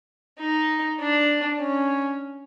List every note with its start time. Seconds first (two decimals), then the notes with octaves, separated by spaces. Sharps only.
0.39 D#4
1.00 D4
1.60 C#4